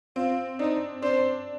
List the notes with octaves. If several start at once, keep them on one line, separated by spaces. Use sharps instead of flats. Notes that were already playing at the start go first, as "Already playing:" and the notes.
C4 F4
D4 D#4
D4 C5